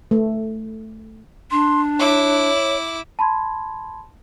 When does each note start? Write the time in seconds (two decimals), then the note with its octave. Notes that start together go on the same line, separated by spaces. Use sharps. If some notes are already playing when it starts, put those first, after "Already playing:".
0.11 A3
1.51 D4 C6
1.99 E4 C#5 D6
3.19 A5 B5 C6 G#6